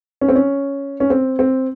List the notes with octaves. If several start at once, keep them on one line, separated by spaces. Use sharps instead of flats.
C#4
C4
C#4
C#4
C4
C4